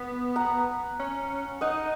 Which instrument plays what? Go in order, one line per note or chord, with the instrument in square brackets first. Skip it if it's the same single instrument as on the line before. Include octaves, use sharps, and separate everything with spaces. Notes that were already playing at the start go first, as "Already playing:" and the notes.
Already playing: [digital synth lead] B3 [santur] F#5
[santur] F#5 A#5
[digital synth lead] C#4
[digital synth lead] D#4 [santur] D#5 F#5